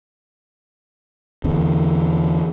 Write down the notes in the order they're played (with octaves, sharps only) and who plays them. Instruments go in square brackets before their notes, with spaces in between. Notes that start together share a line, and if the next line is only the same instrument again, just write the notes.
[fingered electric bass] E2 D3